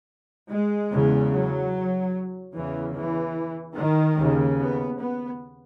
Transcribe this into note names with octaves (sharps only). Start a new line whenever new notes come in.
G#3
E2 C#3
F#3
E2 C#3 E3
E3
D#3
D#2 C#3
B3
B3